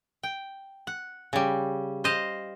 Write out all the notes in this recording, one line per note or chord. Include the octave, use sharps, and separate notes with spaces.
G5
F#5
C#3 G3
C5 D#5 F5